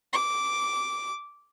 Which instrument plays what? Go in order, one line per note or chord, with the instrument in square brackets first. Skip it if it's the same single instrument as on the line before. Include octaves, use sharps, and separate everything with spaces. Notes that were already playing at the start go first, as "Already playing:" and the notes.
[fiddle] D6